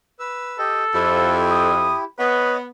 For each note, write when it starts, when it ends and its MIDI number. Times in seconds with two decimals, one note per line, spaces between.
0.19 0.58 71
0.19 0.58 88
0.59 0.84 67
0.59 1.42 69
0.59 0.84 75
0.59 0.84 79
0.94 1.92 41
0.94 2.04 64
0.94 2.04 67
1.51 1.96 87
2.19 2.66 59
2.19 2.54 71
2.19 2.57 73
2.19 2.57 75